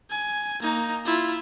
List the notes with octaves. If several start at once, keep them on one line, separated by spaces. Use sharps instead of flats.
G#5
A#3 D#4
E4 F4